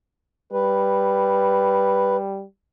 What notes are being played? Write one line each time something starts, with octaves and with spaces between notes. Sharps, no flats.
G3 B4